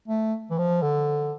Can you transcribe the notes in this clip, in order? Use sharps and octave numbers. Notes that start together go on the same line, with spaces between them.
A3
E3
F3
D3